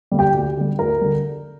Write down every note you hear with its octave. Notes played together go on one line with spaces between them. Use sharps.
D3 G3 A#3
G4 G5
D2
D3 G3
D2 A#4 A#5
D3 G3